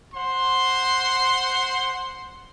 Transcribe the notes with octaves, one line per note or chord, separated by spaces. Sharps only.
C5 F#5 C6